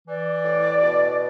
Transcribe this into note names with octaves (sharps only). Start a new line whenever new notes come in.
E3 D5
A2
B2